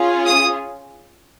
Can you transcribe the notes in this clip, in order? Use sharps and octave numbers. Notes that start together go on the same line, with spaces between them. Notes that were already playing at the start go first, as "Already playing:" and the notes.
Already playing: C#4 F4 G#4
D#6